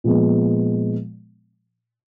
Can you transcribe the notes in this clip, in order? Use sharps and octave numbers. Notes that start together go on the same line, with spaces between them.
A#2 F3 G#3 B3